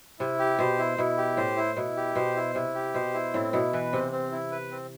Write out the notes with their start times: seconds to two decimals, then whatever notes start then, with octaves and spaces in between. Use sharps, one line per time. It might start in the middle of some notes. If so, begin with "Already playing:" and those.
0.19 C3 E4
0.39 G4
0.59 B2 C5
0.79 E4
0.98 B2 E4
1.17 G4
1.37 A2 C5
1.56 E4
1.76 B2 E4
1.97 G4
2.15 B2 C5
2.36 E4
2.55 C3 E4
2.75 G4
2.94 B2 C5
3.14 E4
3.34 A2 C4
3.53 B2 E4
3.73 E3 B4
3.93 C3 C4
4.12 C4
4.32 E4
4.52 B4
4.71 C4